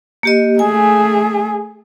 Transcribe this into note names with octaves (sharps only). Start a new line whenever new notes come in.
A#3 G4 D#5
A3 G#4 G#5